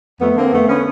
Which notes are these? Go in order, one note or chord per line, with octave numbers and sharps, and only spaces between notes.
F2 A3 B3
D3 A#3 C4
F2 A3 B3
D3 B3 C#4